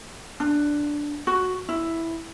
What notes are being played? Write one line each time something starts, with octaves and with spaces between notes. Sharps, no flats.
D4
F#4
E4